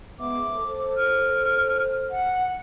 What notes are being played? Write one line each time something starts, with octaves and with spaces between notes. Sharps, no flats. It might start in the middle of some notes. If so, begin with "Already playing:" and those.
G#2 B3 E5 D6
A4 C5
F6
F#5